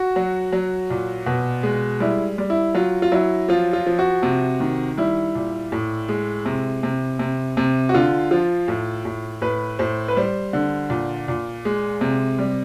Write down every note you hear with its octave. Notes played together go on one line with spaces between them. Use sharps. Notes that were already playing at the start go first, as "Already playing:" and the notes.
Already playing: F#4
F#3
F#3
A#2
B2
G#3
G3 E4
G3
E4
F#3 F4
F4
F#3 E4
F3 F4
F4
F3
F#4
C3
D#3
G3 E4
A#2
A2
G#3
C3
C3
C3
C3
F#4
D3 F4
F3 F4
A2
A2
A2 B4
A2 C5
B4
G3 C5
D3
A#2
A#2
G#3
C3
G3